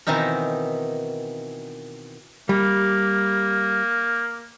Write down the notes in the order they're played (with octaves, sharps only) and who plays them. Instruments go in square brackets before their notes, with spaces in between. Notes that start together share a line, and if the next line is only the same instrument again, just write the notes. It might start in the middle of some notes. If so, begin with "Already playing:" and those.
[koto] B2 D#3 E3 C4 D#4 A#4
[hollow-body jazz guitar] G3 [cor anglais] A#3